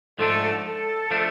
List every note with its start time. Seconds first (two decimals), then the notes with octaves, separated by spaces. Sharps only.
0.19 G#2 F3 A3 D4 A4
0.65 A4
1.11 F3 A3 D4